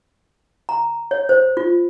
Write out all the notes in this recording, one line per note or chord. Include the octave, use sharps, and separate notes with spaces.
A#5
C#5
C5
F4